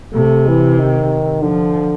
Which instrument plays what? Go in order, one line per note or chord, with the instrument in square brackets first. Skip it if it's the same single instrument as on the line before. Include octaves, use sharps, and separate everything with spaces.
[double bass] C3 [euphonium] A3
[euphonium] E3
D#3
[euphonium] D3 [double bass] F3